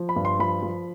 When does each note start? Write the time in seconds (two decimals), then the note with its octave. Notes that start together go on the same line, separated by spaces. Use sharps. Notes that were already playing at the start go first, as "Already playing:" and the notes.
Already playing: F3
0.09 B5
0.16 G2
0.25 C6
0.39 F3 B5
0.63 F3